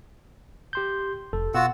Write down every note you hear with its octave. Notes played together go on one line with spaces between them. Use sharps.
G4 C6 G6
F1 A4
B2 F4 F#4 F#5 E6